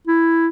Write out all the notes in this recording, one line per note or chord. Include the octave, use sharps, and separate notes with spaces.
E4